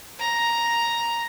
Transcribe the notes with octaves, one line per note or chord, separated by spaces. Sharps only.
A#5